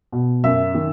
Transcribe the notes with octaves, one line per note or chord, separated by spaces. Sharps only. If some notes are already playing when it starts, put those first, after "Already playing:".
B2
F#2 E5
D#3